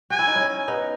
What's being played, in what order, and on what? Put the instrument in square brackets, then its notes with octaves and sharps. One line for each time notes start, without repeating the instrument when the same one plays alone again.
[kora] F#4 [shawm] G#5
[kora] E4
D#4
C#4 E4
B3 D#4